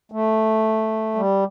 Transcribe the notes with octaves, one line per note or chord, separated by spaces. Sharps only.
A3
G3